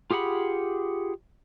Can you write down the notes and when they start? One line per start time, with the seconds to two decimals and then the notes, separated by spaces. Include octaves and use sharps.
0.11 F4 G4 G#4 F#5 B5